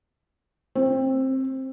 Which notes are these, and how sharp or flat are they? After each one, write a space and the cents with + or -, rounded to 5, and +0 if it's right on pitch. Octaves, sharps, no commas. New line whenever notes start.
C4 +15